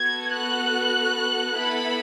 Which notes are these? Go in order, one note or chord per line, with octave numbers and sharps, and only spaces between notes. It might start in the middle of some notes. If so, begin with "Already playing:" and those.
Already playing: B3 F#4 A4 G#6
F#6
B3 E4 A4 B5